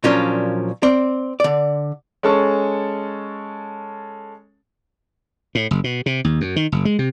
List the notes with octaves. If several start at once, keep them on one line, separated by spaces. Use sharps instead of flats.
A#2 F3 F#3 A#3 C#4 D4
C4 D5
D3 D5
G#3 C#4 A4 A5 C#6
A2
F#1
B2
C3
D#2
F#2
D#3
F#1
G#3
C3